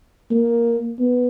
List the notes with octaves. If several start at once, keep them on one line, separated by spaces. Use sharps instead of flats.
A#3
B3